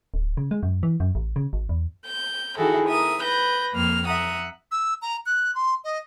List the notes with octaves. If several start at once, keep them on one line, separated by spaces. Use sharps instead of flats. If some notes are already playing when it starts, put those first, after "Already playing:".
D1
C#3
G#3
F#2
E3
F#2
A1
C#3
G#1
E2
G6
D#3 E4 F#4 G#4 A4
A#4 E5 D#6
B4 G6 A#6
F2 A#3 F6
E5 F#5 A#5 D#6
E6
A#5
F#6
C6
D#5